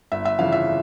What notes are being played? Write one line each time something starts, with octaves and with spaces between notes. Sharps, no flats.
G1 E5
E5
F2 C#3 E3 F5
E5